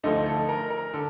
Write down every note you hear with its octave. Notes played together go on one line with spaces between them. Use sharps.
D2 D3 F3 A3 D#4 D#5
A4
A#4
A#4
D3 A4